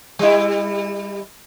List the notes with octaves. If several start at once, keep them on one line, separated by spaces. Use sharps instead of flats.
G3 E4